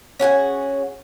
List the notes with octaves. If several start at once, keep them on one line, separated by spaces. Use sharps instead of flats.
C#4 F#4 G#4 F#5